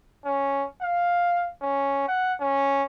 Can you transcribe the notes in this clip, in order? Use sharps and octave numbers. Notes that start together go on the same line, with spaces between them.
C#4
F5
C#4
F#5
C#4